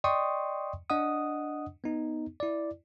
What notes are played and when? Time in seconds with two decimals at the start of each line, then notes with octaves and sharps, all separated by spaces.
0.04 D5 D#5 G5 C6 C#6 D#6
0.90 D4 D#5 F#5 D#6
1.84 B3 D#4
2.40 E4 D5